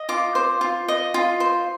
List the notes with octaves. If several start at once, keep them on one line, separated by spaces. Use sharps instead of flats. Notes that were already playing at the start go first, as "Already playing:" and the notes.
Already playing: D#5
F4 D6
C5
F4
D#5
F4
C5